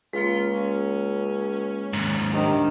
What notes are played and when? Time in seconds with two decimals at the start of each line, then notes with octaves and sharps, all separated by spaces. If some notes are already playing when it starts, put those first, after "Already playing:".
0.13 C#2 G#3 A#3 F4
0.52 C#4
1.93 D#2 G#2
2.33 C3 D#3 D4